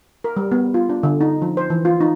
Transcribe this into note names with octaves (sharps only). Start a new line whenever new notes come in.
A#4
G3
B3
F4
D4
D3
D#4
F3
C5
E3
F4
D#4